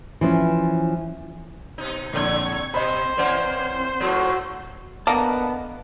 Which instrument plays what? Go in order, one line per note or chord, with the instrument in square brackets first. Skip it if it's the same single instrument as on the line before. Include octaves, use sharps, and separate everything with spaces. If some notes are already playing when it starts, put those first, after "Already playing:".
[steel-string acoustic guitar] E3 F3 C#4
[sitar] B2 D#4
[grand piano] A#1 [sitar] G#2 D3 [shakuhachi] C4 [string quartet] C#6 G#6
[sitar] B2 [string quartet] C5 [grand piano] D#5 B5
[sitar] E3 A#3 C#4 [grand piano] D5 F#5
[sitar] G#2 F3 A#3 [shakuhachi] F#4
[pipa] D3 A#3 [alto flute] B3 [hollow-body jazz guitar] D#5 F#5 A5